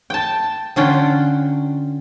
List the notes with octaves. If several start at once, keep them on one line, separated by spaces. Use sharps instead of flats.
G5 A5
D3 C#4 F4 G5